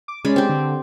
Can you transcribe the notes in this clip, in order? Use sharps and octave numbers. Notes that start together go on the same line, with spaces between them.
D6
G#3 C#4 D5 B5
C4 G4
D3